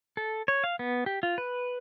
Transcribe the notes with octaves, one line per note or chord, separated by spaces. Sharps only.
A4
C#5
F5
B3
G4
F4
B4